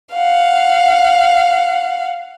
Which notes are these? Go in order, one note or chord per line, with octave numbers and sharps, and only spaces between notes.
F5 F#5